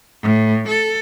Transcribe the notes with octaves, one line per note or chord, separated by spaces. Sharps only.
A2
A4